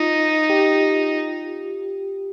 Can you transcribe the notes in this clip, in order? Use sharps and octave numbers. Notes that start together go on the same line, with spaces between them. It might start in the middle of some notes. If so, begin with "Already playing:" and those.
Already playing: D#4 F4
G4